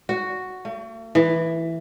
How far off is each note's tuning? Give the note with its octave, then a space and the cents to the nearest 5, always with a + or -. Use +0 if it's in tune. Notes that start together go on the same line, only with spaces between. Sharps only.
F#4 +0
A3 +45
E3 +0